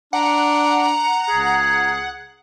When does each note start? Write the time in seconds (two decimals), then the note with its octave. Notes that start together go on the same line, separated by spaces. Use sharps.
0.13 D4 F#5 A#5
1.29 C#2 G#4